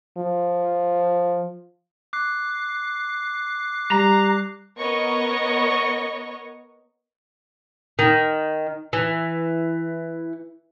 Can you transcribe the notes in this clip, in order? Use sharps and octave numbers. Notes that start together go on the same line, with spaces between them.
F3
D6 F#6 C7
G3 A#5
B3 A#4 C#5 D#5 C#6
D#3
E3